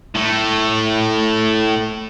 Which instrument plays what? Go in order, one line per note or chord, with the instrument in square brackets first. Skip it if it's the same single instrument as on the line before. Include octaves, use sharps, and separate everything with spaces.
[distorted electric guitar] A2 A3